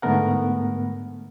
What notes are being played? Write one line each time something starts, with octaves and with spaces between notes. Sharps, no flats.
G#2 D3 A3 B3 A#4 F#5